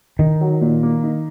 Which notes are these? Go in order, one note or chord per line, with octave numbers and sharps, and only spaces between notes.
D#3 D#4
F#3
A#2
A#3
D#4